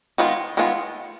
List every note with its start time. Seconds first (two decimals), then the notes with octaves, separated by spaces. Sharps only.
0.18 D#3 G#3 B3 F4
0.57 D#3 G#3 B3 F4